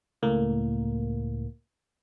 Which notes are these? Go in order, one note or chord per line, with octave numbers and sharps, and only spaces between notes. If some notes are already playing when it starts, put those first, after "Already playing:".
C#2 A2 A#3